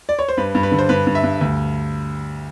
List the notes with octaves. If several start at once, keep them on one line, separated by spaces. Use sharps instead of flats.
D5
C#5
C5
G2 B4
G2
B4
D3
C5
G2 B4
G2
E5
G2
D2